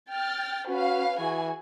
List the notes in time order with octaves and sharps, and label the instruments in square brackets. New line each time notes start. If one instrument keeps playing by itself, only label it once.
[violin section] G5 F6 A6
[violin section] C#4 B4 F5 [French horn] F#4
[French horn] E3 [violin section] F#4 G#4 G#5